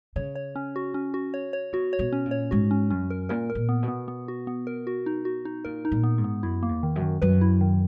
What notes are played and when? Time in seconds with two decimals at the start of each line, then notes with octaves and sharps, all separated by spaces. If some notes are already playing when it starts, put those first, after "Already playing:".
0.16 C#3 C#5
0.36 C#5
0.56 C#4
0.76 F#4
0.94 C#4
1.14 F#4
1.34 C#5
1.53 C#5
1.73 B2 F#4
1.93 C#5
1.99 B2
2.12 C#4
2.26 A#2
2.31 C#5
2.51 G#2 F#4
2.71 C#4
2.90 F#2 C#4
3.10 A#4
3.29 A#2 A#4
3.50 A#4
3.55 A#2
3.69 B3
3.82 B2
3.88 B3
4.08 B3
4.28 F#4
4.47 B3
4.67 A#4
4.87 F#4
5.06 D#4
5.25 F#4
5.45 D#4
5.65 A#2 A#4
5.85 D#4
5.92 A#2
6.03 B3
6.18 G#2
6.24 B3
6.43 F#2 E4
6.63 A#3
6.69 E2
6.83 D#3
6.96 F#2
7.01 D#3
7.22 F#2 B4
7.41 E4
7.61 D#3